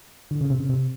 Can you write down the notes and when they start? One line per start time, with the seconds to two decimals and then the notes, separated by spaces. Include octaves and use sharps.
0.31 D3
0.41 C#3
0.50 C3
0.60 C#3
0.69 C3